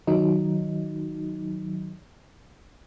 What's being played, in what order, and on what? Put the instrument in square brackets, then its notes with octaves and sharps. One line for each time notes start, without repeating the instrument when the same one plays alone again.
[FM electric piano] D#3 F#3 D#4